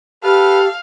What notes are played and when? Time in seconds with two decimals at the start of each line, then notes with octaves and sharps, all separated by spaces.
0.23 G4 A4 B4 F5 F6